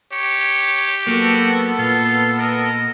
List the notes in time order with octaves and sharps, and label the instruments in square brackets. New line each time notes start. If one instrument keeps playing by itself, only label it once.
[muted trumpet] G4 [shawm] C#5
[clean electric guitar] F#3 A#3 [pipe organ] B3 A4 [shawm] F#4
[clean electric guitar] A#2 [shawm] F4
[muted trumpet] A#4 [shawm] D#5